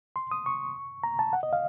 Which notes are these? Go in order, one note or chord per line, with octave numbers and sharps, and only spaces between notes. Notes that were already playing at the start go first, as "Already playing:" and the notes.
C6
D#6
C#6
A#5
A5
F#5
D#5
F5